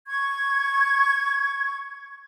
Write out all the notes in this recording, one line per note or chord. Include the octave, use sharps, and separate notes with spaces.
C#6 G#6